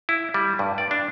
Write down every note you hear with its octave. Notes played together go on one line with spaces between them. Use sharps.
E4
G3
G2
D5
D4